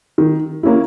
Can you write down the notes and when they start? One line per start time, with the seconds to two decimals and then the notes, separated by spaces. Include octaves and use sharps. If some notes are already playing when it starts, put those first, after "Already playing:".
0.18 D#3
0.63 A#3 C#4 E4